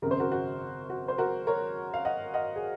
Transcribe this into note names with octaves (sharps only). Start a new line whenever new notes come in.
G#1 F#2 C#3 A#4
C5
F#4 A#4
F#4
F#4
C5
F#4 A#4
A#4 C#5
F5
D#5 F#5
D#5 F#5
G#4